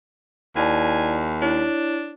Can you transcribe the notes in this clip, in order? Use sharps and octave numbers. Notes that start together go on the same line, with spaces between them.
D#2 E4 D5 G#5 A5
D4 E4 C#5